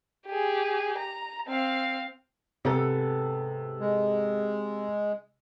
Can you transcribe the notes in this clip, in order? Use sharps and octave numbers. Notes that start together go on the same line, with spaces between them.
G4 G#4
A#5
C4 F5
G#2 C3 B3 A4
G#3